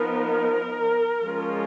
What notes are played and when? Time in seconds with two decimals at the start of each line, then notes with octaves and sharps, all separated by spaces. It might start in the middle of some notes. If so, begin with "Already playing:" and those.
Already playing: F3 B3 D#4 A#4
1.23 F3 G#3 C#4 F4